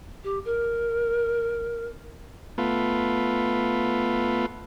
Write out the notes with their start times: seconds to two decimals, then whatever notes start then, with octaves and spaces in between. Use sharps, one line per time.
0.24 G4
0.45 A#4
2.58 A3 B3 F4